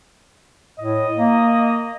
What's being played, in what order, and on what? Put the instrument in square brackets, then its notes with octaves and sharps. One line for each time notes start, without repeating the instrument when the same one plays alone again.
[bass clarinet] A2 [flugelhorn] D#5
[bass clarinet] A#3